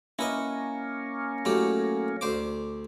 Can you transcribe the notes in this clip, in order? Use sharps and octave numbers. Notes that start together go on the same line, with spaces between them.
A#3 C#4 E4 B4 D#5
A2 F#3 G4
D2 C5 D6